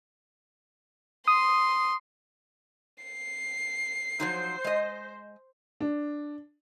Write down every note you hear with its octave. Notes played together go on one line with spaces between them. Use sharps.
C6 D#6
C7
F3 F#3 D#4 C5
G#3 D#5
D4